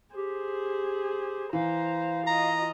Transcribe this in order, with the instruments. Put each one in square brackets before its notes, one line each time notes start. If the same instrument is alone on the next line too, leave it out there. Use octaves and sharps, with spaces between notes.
[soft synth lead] G4 [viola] G#4 C5
[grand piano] E3 [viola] C5 A#5 [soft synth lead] F5
[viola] F4 D#5 [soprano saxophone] A#5